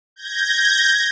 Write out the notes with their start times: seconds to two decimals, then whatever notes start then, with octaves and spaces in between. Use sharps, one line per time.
0.16 G6 G#6 A#6